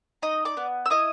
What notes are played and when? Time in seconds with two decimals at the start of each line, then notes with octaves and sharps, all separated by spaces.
0.22 D#4 D#5 D#6
0.45 D5 D6
0.57 B3
0.86 E6
0.90 E4 D#5 D#6